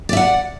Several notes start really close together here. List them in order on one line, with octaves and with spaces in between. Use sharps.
D5 E5 F#5